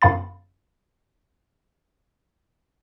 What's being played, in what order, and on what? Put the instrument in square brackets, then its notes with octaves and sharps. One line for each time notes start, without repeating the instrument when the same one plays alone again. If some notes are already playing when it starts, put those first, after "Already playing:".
[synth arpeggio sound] G1 F#2 F5 B5 A6